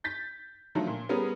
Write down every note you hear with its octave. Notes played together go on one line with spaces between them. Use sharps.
G6 A6 B6
D3 D#3 F3 F#3 A3
A#2
G3 B3 C#4 G#4 A#4